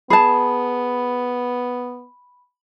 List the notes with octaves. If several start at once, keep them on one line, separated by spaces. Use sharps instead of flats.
B3 G#4 A5 B5